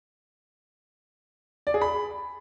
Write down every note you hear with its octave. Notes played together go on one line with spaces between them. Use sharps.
D5
G#4
B5